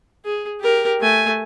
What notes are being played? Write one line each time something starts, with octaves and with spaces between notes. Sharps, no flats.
G#4
G4 A#4
A3 G#5